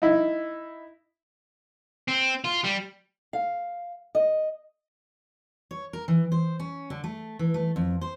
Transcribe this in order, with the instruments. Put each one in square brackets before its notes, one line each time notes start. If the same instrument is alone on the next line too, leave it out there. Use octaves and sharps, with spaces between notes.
[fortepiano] D#4 E4
[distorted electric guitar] C4
F4
G3
[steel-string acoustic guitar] F5
D#5
C#5
A#4
E3
C5
C#4
D3
A3
E3
A3
F2
C5